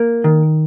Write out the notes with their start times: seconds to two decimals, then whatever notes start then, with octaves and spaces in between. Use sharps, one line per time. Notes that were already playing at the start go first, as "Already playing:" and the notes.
Already playing: A#3
0.24 D#3